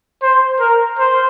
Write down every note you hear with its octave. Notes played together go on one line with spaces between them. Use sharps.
C5
A#4
C5